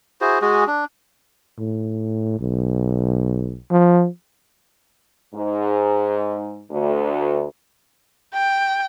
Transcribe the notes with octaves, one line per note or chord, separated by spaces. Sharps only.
E4 F#4 G#4 C5
G#3 F#4 G#4
D4
A2
B1
F3
G#2
D2
G5